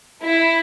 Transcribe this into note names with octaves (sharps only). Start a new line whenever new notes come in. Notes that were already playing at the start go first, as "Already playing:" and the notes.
E4